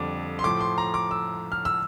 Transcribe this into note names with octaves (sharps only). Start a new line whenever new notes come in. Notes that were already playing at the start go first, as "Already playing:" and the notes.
Already playing: F2 D3 G3 D6
C6
A2 F3 D6
C6
A#5
D6
E6
F6
E6